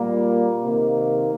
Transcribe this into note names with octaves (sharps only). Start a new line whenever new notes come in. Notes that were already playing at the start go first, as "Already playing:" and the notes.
Already playing: A#2 G3 A#3
C3 D#3 A#3 D#4